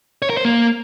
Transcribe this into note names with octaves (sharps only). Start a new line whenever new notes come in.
C#5
A#4
C5
A#3